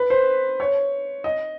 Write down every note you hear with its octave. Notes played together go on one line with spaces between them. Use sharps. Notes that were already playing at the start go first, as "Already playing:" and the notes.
Already playing: B4
C5
C#5
D#5